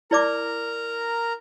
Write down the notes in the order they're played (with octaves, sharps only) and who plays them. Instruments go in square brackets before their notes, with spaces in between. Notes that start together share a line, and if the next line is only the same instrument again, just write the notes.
[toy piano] E4 D5 D6 [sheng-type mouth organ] A#4 A#5